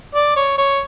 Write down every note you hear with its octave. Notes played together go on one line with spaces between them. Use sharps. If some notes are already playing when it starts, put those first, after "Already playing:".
D5
C#5
C#5